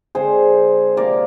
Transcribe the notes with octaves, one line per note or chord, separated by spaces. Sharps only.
D3 G#3 C4 G#4 C5
C3 F3 A#3 A#4 D5